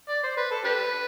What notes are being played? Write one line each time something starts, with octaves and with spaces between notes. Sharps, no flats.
D5
C5
B4
A4
D4 G4 B4